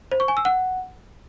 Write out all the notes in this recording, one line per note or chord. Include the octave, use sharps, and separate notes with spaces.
C5
C#6
G#5
E6
F#5